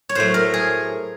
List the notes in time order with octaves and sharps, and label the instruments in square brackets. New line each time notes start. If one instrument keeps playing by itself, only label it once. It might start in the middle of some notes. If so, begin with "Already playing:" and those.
[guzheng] C#5
A2 F#3 A3 C5
A#4
G#4